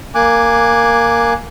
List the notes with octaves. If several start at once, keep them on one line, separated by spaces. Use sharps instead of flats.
A#3 G#5 D6 F#6